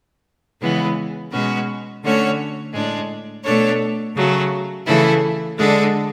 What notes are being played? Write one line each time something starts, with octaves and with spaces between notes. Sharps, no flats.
C#3 E3 G#3 B3 E4
B2 G#3 C#4 F#4 B4
D3 A3 C#4 F#4 C#5
A2 G#3 D4
B2 A3 D4 A4 C#5
C#3 F#3 A3
C#3 E3 A3 E4 A4
D3 G#3 D4 A4